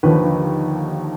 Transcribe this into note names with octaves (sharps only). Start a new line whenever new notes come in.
D#2 D3 F3 B4